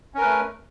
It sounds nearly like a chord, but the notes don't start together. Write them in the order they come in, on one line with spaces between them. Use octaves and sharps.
C#4 A#4 B4 A3